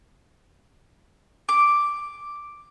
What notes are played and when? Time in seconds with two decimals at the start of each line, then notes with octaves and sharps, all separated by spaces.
1.49 D6